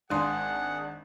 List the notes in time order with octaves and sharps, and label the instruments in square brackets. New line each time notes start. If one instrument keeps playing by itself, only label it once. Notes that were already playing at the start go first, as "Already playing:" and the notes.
[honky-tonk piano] G#1 D4 [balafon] G#3 C6 [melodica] G#4 [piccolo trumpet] F#5